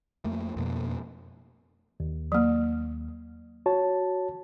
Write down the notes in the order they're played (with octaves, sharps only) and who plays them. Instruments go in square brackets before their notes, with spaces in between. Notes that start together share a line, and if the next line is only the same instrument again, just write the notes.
[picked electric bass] F2 A3 A#3
F2 B2 A#3
[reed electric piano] D#2
[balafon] F#3 A#3
[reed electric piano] F#4 C#5 A5